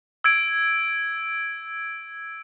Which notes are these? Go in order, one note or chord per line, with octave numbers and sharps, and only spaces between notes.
E6 G#6 D7